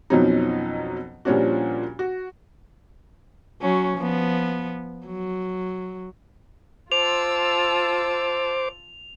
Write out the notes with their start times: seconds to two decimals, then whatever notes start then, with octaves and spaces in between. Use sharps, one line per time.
0.10 F2 B2 F3 F#3 C#4 D#4
1.25 A#2 F3 G3 C#4 D4 F#4
1.99 F#4
3.62 F#3 C#4
3.98 F3 B3
5.07 F#3
6.92 F4 C5 A5 D6 E6 F7